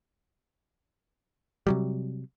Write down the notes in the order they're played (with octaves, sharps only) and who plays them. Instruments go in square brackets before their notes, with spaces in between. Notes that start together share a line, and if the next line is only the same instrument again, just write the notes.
[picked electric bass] C3 F#3 G3